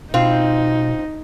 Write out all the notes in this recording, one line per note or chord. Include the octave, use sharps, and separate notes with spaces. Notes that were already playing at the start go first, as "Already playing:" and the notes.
B2 C4 D#4 F4